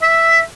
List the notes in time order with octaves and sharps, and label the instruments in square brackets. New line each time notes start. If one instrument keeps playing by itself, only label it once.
[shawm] E5 [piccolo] B6